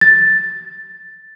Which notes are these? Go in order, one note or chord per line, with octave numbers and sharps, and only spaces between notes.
A6